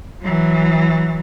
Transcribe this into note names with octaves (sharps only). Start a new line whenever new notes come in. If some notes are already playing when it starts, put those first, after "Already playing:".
E3 F#3